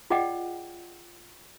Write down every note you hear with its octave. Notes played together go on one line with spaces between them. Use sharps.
F4 G#4 D5 D#5 F#5 G5